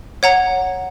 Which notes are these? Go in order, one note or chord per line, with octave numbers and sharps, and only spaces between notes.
C#5 F#5 A#5